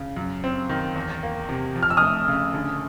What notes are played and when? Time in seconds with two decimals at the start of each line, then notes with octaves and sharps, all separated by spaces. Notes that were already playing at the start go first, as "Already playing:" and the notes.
Already playing: C#3
0.17 F#2
0.44 C4
0.69 D#3
0.96 E2
1.23 A#3
1.49 C3
1.75 F2
1.83 F6
1.90 E6
1.97 A3 D#6 F6
2.28 C#3
2.54 D3